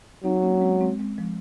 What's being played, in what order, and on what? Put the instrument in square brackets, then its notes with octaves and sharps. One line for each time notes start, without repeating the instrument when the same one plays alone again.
[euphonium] F#3 [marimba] C4 D#4
[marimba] A#3 C#4
C#4
G#3 C4
G#3 C4
G#3 C4
F3 G#3